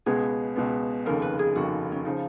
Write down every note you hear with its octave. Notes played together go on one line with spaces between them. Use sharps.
C#2 B2 G#3 B3 G#4
C#2 B2 G#3 B3
F1 D#2 C#3 A#4
B4
G#4
F1 D#2 C#3 F#4
C#4
C#3 F3 D#4